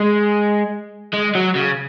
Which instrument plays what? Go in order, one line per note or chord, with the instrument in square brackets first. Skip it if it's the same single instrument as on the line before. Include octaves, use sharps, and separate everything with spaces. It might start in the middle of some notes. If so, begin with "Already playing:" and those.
Already playing: [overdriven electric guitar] G#3
G#3
F#3
C#3